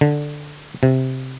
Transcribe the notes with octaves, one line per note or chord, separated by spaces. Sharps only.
D3
C3